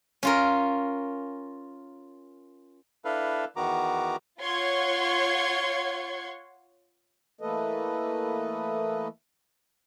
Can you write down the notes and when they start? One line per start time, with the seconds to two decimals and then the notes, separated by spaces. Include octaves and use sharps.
0.23 C#4 F4 A#4
3.05 D4 E4 A4 B4 F5
3.56 E2 D#3 B3 F#4 A#5 D6
4.41 F4 C#5 F#5 C6 C#6 G#6
7.41 E3 A3 A#3 A4 B4 D#5